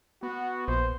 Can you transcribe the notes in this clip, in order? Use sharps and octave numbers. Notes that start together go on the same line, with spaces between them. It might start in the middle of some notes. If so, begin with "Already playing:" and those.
B3 F#4
A#1 C5